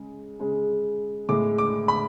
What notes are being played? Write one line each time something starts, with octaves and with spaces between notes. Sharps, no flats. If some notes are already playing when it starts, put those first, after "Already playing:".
Already playing: C#3 G#3
C#3 G#3
A2 G#3 D6
D6
B5